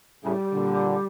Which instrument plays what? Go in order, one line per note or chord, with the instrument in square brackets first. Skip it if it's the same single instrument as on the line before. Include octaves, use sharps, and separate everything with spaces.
[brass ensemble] A2 C#3 [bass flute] G3
[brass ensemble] A#2 D3